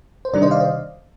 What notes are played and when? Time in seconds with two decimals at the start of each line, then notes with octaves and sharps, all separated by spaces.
0.25 C5
0.33 C3 D#3 G3 D4 A#4 D5
0.42 C5 D#5
0.51 D5 F5
0.60 C5 D#5